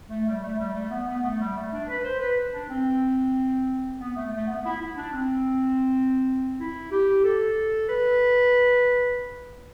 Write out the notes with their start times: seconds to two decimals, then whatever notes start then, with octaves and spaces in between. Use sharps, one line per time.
0.09 A3
0.26 G3
0.41 A3
0.58 G3
0.74 A3
0.90 B3
1.06 B3
1.23 A3
1.39 G3
1.55 A3
1.72 D4
1.88 B4
2.03 C5
2.20 B4
2.52 D4
2.69 C4
3.99 B3
4.16 A3
4.31 A3
4.47 B3
4.64 E4
4.80 E4
4.96 D4
5.12 C4
6.59 E4
6.91 G4
7.24 A4
7.89 B4